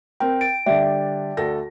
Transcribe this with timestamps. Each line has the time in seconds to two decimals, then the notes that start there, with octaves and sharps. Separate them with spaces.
0.20 C4 A#4 G5
0.41 A6 D7
0.66 D3 G3 D5 E5 G5
1.37 D2 A4 A#6